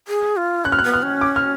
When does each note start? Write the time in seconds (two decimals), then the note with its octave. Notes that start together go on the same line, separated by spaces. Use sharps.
0.08 G#4
0.37 F4
0.65 C#4 F#6
0.72 F6
0.79 F#6
0.84 B3
0.94 F6
1.03 C#4
1.21 D6
1.36 F6